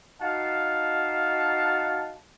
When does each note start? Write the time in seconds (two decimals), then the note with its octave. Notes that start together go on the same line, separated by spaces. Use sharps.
0.21 D#4 F#4 F5 A5